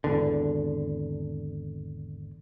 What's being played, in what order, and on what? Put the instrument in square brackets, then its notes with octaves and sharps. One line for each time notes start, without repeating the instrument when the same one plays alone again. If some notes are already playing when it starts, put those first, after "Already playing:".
[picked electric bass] G#1 E2 D3